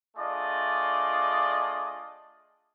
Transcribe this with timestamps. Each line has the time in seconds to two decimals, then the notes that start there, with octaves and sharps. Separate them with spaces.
0.17 A3 D4 F4 G#4 D5 D#5